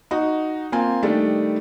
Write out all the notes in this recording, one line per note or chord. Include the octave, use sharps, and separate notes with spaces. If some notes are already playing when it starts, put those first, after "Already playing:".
D#4 F#4
A#3 C4 F4 G#5
D#3 G3 A3 D4